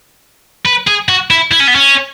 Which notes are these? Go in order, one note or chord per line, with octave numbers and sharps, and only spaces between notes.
B4
G#4
F#4
E4
E4
C#4
B3
C#4